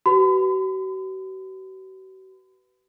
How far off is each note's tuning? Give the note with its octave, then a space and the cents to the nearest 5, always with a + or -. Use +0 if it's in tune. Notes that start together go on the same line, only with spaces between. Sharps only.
F#4 +45 B4 +5 B5 +45